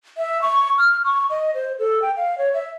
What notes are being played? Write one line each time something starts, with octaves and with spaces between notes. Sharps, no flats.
E5
C#6
F6
C#6
D#5
C5
A4
G5
F5
C#5
E5